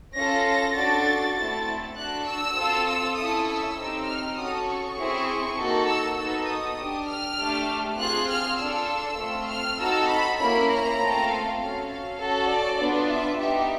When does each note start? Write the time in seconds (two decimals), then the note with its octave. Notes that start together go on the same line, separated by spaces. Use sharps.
0.16 C#4 F4 A4 A#6
0.47 A#6
0.76 D4 F#4 A4 A6
1.37 A3 C4 E4 A4 A6
1.97 D4 F#4 A4 F#6
2.27 E6
2.56 C4 F4 A4
2.86 E6
3.17 C#4 E4 A4 D#6
3.47 E6
3.77 C4 D#4 G4
4.07 F6
4.37 C#4 F#4 A4 D#6
4.68 C#6
4.97 C4 E4 G#4
5.57 A#3 D#4 F#4 A4
5.87 E6
6.17 B3 D#4 F#4 A4 E6
6.47 D#6
6.78 D4 G4
7.07 F6
7.38 A3 D4 G4
7.98 C4 F4 G#4 F#6
8.28 F6
8.58 D4 F4 A4 E6
9.19 A3 C4 F4
9.49 F6
9.79 C4 D#4 F#4 A4 E6
10.09 B5
10.39 A#3 C#4 E4 B5
10.69 A#5
10.99 A3 C4 F4 A4
11.29 F5
11.59 C#4 F#4 A4 F5
11.90 F5
12.19 C#4 F#4 A4
12.49 D5
12.80 B3 D4 F4
13.09 E5
13.39 B3 D#4 G4 E5